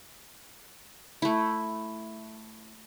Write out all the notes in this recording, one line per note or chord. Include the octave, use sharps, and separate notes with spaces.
A3 E4